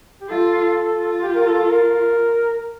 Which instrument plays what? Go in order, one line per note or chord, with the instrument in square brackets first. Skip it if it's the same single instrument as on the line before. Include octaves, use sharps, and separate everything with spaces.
[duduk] G4
[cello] F4 [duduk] A4
[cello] F4
[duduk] G4
A#4
A4
A#4